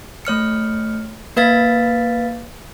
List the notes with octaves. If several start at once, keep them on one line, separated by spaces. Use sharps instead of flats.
A3 C#5 F6 C#7
A#3 B4 F5 A6 B6